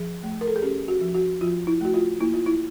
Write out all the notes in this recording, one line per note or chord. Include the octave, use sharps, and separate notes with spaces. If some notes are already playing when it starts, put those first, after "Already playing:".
Already playing: F3 G#4
A3
A#4
A4
G#4
C#4 G4
F#4
F3
F#4
F3 F4
E4
A3 F#4
F4
A#3 E4
F4
E4